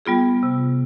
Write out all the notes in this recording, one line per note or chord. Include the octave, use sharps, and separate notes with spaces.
G3 B3 F4 G#4
C3